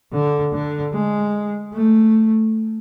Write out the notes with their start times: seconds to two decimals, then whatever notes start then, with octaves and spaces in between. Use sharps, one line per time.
0.13 D3
0.53 D3
0.93 G#3
1.73 A3